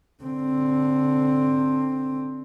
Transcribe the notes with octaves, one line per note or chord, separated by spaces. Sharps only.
D3 C4